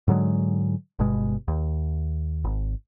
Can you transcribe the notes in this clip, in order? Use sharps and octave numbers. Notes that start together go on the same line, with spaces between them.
G#2 D3 F#3 G#3
G1 G2 B2 G#3
D#2
G#1